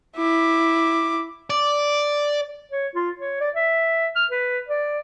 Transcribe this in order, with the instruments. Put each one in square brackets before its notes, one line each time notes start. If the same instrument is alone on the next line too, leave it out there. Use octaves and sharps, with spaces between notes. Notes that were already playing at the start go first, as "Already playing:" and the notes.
[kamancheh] E4 D6
[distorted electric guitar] D5
[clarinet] C#5
F4
C#5
D5
E5
F6
B4
D5